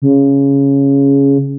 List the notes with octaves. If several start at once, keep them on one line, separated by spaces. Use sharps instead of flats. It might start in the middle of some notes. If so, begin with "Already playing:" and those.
C#3